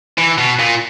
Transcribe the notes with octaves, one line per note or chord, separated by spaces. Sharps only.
E3
B2
A#2